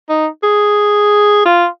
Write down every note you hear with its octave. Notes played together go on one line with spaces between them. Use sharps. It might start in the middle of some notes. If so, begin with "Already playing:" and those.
D#4
G#4
F4